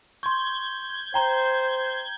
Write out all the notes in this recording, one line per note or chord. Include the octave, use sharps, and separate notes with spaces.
C6 C#6 G6 G#6
C5 G5 A#5 G7